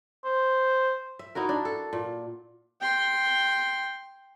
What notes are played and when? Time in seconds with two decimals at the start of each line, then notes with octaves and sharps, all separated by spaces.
0.24 C5
1.19 E5
1.35 D#4 E4 F#4 A#4
1.49 D4
1.65 A4
1.93 A#2
2.81 G5 C6